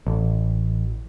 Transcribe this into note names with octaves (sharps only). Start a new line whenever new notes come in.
A1